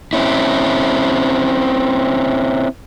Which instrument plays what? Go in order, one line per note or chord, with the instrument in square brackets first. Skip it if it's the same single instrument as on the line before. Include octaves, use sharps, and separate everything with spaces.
[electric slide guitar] C4 C#4 E4